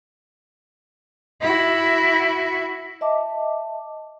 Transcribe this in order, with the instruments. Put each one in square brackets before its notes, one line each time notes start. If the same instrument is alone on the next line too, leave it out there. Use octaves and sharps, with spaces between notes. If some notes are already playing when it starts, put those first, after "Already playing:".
[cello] E4 F#4
[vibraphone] D#5 E5 A5 D6